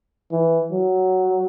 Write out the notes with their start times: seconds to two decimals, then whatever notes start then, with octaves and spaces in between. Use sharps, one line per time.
0.32 E3
0.71 F#3